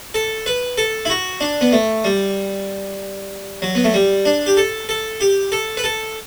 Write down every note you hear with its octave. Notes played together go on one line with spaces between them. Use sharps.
A4
B4
A4
E4
F#4
D4
B3
A3
G3
F#3
B3
A3
G3
D4
G4
A4
A4
G4
A4
B4
A4